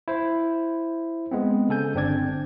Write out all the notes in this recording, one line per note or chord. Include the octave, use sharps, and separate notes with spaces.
E4 C5
G#3 B3 C4
C#3 A4 G#5 G6
G1 C4 D4 D5 G#6